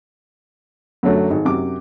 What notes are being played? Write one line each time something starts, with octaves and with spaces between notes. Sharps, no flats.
F#2 D3 F#3 A3
G#1
F#2 C3 D6